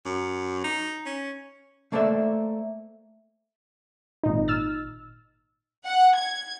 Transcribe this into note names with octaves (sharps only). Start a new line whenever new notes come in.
F#2
D#4
C#4
A3 A#3 A4 C5 D5 E5
G#1 A#2 D#4
E6 F6 A6
F#5
G#6